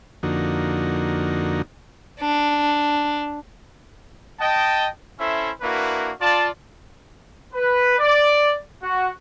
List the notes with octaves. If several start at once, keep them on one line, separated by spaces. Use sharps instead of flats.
F2 D3 A#3 D#4 F#4
D4
D#5 G5 A5
C#4 E4 A4 C5 E5
A#3 D4 E4 F#4 A#4 B4
F4 D5 A5
B4
D5
F#4